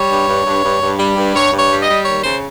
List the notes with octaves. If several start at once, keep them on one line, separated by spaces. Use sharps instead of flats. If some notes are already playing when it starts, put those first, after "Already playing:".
Already playing: G3 C#5
G2
G2
G2
G2
G2
G3
G2
G2 C#5
G2
C#5
G3
D#5
G3
D#2 C#5
C#3 C5